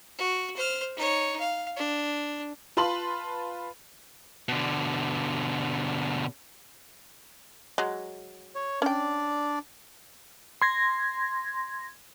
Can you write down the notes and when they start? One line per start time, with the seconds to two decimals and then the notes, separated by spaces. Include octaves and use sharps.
0.18 F#4
0.56 C5 F6
0.96 D#4 C#5
1.40 F5
1.77 D4
2.77 F4 B4 A5 B5 C6 F#7
4.48 B2 D3
7.78 F#3 G#3
8.55 C#5
8.82 C#4 D4 D5 G5
10.62 C6 G#6 A#6